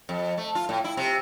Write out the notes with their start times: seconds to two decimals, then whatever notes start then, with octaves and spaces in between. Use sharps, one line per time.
0.09 F2
0.37 A3
0.55 F4
0.69 A2
0.84 E4
0.97 C3